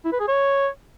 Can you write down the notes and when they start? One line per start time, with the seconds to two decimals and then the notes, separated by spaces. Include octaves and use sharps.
0.05 E4
0.12 B4
0.20 G#4
0.28 C#5